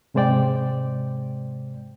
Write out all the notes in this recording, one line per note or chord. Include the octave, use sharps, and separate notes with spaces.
G#2 C3 G#3 C5 D5 G5